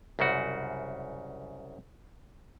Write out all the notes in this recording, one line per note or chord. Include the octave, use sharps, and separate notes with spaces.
C2 F#2 C#3 F#4